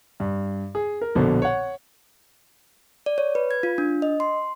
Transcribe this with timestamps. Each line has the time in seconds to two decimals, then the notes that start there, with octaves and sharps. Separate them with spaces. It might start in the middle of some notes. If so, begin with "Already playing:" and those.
0.20 G2
0.75 G#4
1.01 A#4
1.15 A#1 B2 D3
1.42 C#5 F#5
3.06 D5
3.18 C#5
3.35 B4
3.51 G#6
3.63 F4
3.78 D4
4.02 D#5
4.20 C6